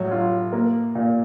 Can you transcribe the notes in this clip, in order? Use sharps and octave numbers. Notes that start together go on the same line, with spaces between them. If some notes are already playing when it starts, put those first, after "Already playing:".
Already playing: A2 F#3
F4
A#3
A#2